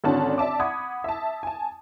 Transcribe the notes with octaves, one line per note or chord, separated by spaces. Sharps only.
G#1 D3 C#4 D4 F#4 A5
D5 E5 A5 D6
F#5 B5 D#6 G#6
E5 A5
G#5 A5